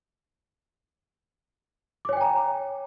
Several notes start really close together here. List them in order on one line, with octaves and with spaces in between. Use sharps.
D6 C#5 G#5 G5 A#5